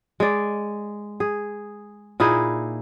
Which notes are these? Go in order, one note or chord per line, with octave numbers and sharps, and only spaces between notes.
G#3 D5
G#4
A#2 D#4 E4 G#4